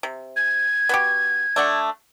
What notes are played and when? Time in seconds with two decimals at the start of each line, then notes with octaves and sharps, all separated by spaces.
0.03 C3
0.36 G#6
0.89 B3 F#4 G4
1.56 A3 D4 F#5